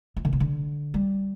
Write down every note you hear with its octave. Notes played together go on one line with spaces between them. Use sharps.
F3
D3
C3
D3
G3